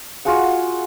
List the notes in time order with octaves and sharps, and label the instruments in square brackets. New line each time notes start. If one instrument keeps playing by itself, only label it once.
[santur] F4 F#4 G#4 F#5